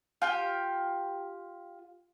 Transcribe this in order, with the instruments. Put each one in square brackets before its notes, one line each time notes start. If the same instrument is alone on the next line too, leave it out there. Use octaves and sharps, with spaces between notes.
[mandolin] F4 G4 G5